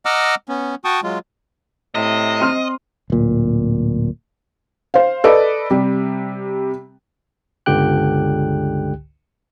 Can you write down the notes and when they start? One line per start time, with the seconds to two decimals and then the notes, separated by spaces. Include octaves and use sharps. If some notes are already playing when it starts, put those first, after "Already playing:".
0.05 D#5 F#5 A#5 D6 E6 F6
0.49 B3 C#4
0.84 F#4 G5 A5 C#6 D#6
1.04 F#3 G#3 F4
1.95 A2 C3 D#5
2.40 C4 C6 F6
3.10 D1 A#2
4.94 C5 F5
5.24 A4 B4 D5 D#5
5.70 C3 G3
7.66 G1 C#2 D3 G4 G5 F#6